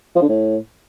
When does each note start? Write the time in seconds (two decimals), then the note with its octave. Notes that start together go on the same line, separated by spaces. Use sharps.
0.15 F3
0.22 D3
0.28 A2